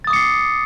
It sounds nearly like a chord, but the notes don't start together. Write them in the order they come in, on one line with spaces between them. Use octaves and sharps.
A6 D#6 D6 C#7 C7